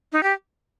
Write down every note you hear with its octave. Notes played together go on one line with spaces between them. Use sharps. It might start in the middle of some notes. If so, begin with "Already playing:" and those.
D#4
G4